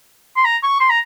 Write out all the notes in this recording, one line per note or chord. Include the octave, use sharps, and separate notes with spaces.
C6
A#5
C#6
C6
A#5